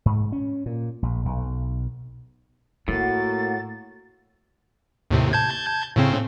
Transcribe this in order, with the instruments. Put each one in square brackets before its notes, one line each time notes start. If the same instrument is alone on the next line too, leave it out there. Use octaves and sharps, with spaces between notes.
[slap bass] G#2
C#4
A#2
A#1
B1
[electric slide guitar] A2 [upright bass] A3 [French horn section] A#3 F#4 [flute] A6
[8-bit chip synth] D#2 A2 C3
A5 G6 G#6
A2 C#3 C4